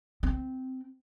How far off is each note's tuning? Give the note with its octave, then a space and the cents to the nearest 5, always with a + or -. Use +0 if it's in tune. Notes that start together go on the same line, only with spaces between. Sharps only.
C4 -15